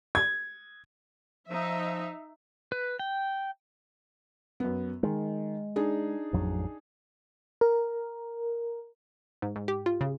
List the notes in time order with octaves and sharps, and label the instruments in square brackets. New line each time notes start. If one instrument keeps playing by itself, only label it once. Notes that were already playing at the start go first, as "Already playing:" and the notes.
[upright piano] G#6
[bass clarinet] F3 [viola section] D#4 E5
[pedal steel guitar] B4
G5
[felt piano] F#2 B3
[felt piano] D#3 [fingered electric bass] G#3
[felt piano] D4 D#4 G#4
[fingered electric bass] A1 F2 F#3
[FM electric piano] A#4
[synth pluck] G#2
G#2
G4
F4
C#3